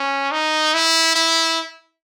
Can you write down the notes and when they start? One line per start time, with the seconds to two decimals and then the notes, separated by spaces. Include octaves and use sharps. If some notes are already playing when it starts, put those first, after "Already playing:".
Already playing: C#4
0.31 D#4
0.74 E4
1.16 E4